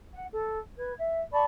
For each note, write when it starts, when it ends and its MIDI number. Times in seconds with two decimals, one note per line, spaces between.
0.12 0.25 78
0.32 0.59 69
0.77 0.92 71
0.77 0.92 92
0.99 1.20 76
1.32 1.43 74
1.32 1.43 81
1.32 1.43 83
1.32 1.43 85